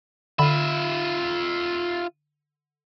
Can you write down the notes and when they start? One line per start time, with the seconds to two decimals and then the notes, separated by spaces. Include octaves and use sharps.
0.39 D3 F4 E5 B5